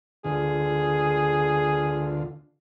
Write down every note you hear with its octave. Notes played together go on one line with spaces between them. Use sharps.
D2 D3 F4 G#4